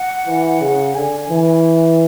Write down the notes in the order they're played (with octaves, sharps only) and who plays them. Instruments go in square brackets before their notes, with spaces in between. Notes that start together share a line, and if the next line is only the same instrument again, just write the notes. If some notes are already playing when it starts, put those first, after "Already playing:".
Already playing: [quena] F#5
[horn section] E3
C#3
[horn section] D3 [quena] G#5
[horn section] E3